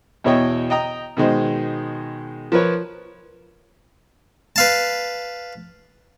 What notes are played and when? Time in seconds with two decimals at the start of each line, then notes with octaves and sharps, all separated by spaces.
0.24 E2 B2 E4 C#5 D#5 G5
0.70 D#5 G5 A#5 D#6
1.17 B2 D#3 G#3 C5
2.52 F3 A#4 B4 C#5
4.56 B4 F5 A5